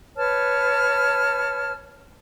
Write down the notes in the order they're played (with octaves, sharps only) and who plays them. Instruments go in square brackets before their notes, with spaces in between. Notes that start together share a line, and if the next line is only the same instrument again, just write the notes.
[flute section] B4 C#5 A5 F6